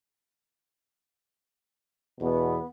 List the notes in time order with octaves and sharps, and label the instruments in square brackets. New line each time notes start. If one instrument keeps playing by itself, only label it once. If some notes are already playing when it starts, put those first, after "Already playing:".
[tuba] E2 [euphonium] B2 [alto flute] B3